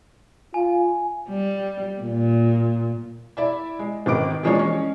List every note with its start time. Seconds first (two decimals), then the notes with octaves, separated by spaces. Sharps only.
0.54 F4 G#5
1.29 G3
2.01 A#2
3.37 E4 D5 E5
3.79 G#3
4.06 G#1 D#3 B4 D6 D7
4.43 E3 F3 G#3 A#3 D4 C#5
4.59 G#3 C#4